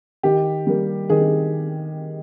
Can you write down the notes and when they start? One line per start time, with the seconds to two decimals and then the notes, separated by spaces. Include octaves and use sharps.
0.23 D#3 G4
0.67 G3 A#3
1.10 D#3 G#4